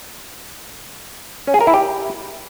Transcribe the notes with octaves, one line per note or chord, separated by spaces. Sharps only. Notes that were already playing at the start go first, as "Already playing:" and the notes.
C#4
G#4
A#4
E4
G4